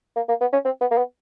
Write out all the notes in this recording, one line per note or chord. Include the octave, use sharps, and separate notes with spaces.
A#3
A#3
B3
C#4
C4
B3
A#3
B3